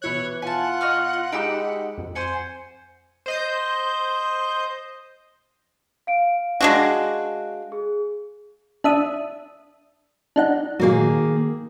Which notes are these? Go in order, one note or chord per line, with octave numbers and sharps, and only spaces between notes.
B2 E3 E4 C#5 F#6
F4 F#5 G#5 A5
D#5 C#6 F6
G#3 D#4 G4 G5 B5 E6
F2
C5 F#5 G#5 C6
C5 D#5 G6
F5 D7
G#3 D4 F#4
G#4
D4 E5 D#6
D4 D#4 F#5
A#2 D#3 F#3 A#3 G#4